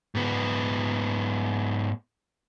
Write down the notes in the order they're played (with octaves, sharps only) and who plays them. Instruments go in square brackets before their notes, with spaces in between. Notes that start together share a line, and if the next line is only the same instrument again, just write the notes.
[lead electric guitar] G#2 B3